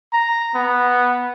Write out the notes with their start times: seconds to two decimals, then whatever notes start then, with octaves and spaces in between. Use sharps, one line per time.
0.13 A#5
0.55 B3